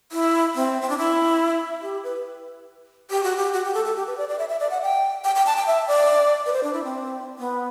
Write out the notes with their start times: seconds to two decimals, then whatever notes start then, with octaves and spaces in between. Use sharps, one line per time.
0.12 E4
0.55 C4
0.82 C4
0.89 D4
0.98 E4
1.82 G4
2.04 B4
3.10 G4
3.23 F#4
3.37 G4
3.53 F#4
3.65 G4
3.74 A4
3.85 A4
3.96 G4
4.07 B4
4.18 D5
4.29 D5
4.39 E5
4.49 E5
4.60 D5
4.70 F#5
4.82 G5
5.24 G5
5.36 G5
5.46 A5
5.57 G5
5.67 E5
5.88 D5
6.46 B4
6.53 C5
6.63 D4
6.73 E4
6.84 C4
7.38 B3